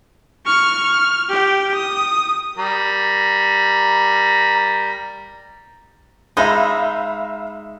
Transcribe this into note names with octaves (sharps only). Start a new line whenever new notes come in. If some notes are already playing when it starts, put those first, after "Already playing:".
C#6 F6
F6
G4 G5
D#6
G3 A#4 A#5
G#3 D#4 E5 F5 B5